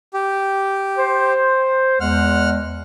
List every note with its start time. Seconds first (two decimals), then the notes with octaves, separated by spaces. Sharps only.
0.14 G4
0.97 C5
2.00 E2 G#3 F#5 F6